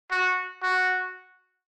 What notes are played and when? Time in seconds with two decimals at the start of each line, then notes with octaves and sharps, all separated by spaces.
0.11 F#4
0.63 F#4